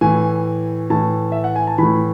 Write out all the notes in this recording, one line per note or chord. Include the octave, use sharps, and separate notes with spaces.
A2 E3 G#5
A2 E3 A5
E5
F#5
G#5
A5
A2 E3 B5